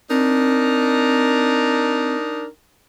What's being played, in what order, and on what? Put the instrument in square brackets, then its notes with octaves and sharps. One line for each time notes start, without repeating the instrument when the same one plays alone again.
[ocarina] C4 [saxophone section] D4 D#4 A#4